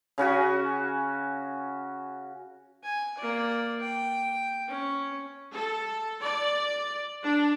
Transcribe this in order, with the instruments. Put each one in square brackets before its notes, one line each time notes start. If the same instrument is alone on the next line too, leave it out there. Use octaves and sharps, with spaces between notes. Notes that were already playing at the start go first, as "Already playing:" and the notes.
[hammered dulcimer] C#3 C#4 F#4 G#5
[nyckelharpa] G#5
A#3 D5
G5
C#4
[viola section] A4
D5
D4